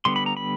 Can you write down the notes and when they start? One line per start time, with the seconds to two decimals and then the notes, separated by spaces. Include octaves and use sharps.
0.05 D3 G3 B3 C6
0.16 B5
0.26 A#5
0.37 B5